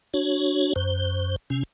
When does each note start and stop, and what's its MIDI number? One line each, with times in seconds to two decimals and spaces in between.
0.14 0.73 62
0.14 0.73 66
0.14 0.73 73
0.76 1.36 42
0.76 1.36 72
1.50 1.63 48
1.50 1.63 61